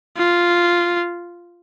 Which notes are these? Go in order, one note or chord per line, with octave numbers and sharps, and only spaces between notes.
F4